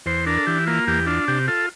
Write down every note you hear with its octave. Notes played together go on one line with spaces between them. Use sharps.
E2 C5
D4 A#4
A4
E3 G4
A#3 F4
E2 G4
D4 F4
C3 G4
F4 A4